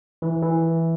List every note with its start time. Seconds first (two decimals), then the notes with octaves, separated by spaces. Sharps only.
0.22 E3
0.42 E3